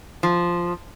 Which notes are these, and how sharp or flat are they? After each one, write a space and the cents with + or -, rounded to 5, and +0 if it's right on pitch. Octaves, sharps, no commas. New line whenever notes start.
F3 -5